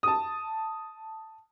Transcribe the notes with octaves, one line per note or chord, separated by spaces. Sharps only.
A5 D#6